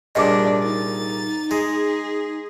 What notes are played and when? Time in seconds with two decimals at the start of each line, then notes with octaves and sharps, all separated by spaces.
0.15 C2 A#2 C#3 D4 D#5 D6
0.64 D#4 A6
1.51 G#3 G#4